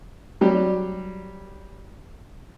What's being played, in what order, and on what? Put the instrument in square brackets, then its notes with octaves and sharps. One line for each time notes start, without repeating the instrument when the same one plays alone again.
[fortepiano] F#3 G3 G4